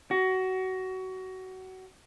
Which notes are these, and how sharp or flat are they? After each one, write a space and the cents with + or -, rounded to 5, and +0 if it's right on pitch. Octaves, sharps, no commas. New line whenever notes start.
F#4 +20